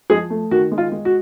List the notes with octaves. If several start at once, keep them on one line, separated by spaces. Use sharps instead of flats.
F3 G#3 G#4
A3
D#3 F#4
G#3
F4
G#3
F#4